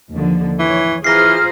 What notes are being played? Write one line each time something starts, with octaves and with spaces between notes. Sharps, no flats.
D#2 D3 F3
E3 F3 C#5
E3 F4 G#4 C5 A#5 F6 A#6 C7